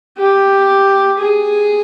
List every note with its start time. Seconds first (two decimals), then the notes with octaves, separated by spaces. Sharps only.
0.18 G4
1.19 G#4